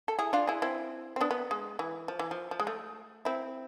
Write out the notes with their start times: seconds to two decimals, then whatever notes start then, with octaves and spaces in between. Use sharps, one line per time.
0.08 A4
0.19 E4 G#4
0.33 D4 F4
0.47 E4 G#4
0.62 C4 E4
1.16 C4
1.21 B3 D4
1.31 B3
1.51 G#3
1.79 E3
2.08 F3
2.19 E3
2.31 F3
2.51 F3
2.60 G#3
2.67 A3
3.25 C4 E4